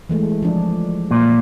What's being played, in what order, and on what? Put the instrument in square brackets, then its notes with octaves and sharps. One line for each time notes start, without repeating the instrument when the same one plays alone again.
[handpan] E3 G#3 A3
F3 D4
[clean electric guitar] A#2